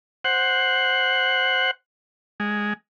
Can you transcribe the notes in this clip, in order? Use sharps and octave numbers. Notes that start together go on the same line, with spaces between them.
C5 F#5
G#3